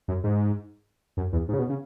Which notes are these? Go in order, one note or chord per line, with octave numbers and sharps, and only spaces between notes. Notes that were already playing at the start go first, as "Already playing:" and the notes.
F#2
G#2
F#2
E2
G#2
C#3
B2
C#3